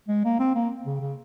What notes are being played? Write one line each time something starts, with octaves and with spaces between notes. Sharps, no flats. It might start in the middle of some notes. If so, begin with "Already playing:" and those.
G#3
A#3
C4
A#3
C#3
C#3